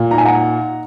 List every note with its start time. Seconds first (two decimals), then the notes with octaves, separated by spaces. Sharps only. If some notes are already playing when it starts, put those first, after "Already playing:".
Already playing: A#2
0.10 D#4 A#5
0.18 G#5
0.25 F#5 A#5